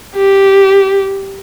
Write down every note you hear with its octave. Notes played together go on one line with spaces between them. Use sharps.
G4